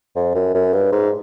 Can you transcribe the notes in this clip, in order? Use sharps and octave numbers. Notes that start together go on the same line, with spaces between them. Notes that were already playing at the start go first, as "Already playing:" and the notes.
F2
F#2
F#2
G2
G#2